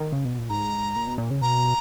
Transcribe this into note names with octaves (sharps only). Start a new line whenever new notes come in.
D#3
C#3
B2
A#2
G#2 A#5
A#2
B2
A#2
C#3
B2 A#5